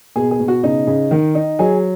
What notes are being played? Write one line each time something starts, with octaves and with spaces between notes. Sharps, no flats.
B2 G#4
G#4
B2
F#4
C#3 D#4
C#3
D#3
D#4
F#3 G#4